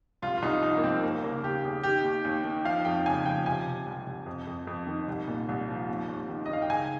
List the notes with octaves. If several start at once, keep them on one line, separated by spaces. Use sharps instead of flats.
C2 F4
F4
C2 D#4
F3 D#4
A#3
C2 C4
D#2 A#3
C#3 A#3
D#2 G4
D#2 G#4
D#3 G4
D#2
D#2
D#3
F3 F5
F2 G5
C#3 G#5
F3 G5
C3 G#5
C3
C2
C2
F2
F2
F2
D#3
C2
A#2
C2
F3
D#2
D#2
D#3
D#5
D#3 F5
G5
C#2 G#5